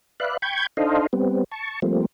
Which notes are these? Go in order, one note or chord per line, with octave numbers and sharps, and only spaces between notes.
B4 D5 E5 F5 F#6
G5 B5 C#6 G6 G#6
D4 D#4 A4 C5 D#5 F5
G3 B3 C4
A5 C#6
F3 G3 A3 A#3 C4